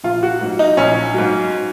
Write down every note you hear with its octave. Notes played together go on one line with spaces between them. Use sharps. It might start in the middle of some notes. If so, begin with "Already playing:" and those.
A#1 F4
F#4
G#2 F#3
D#4
A#1 C#4
G#2 F#3